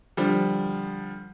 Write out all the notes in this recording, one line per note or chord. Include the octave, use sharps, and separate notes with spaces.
D3 F3 G3